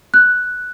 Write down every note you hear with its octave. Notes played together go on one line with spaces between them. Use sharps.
F#6